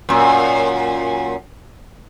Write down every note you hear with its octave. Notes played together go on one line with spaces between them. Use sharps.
F#2 A#2